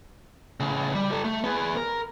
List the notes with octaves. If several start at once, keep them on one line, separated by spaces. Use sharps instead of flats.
A2 C#3
G3
G4 A4
A3
B3 G#4
A#4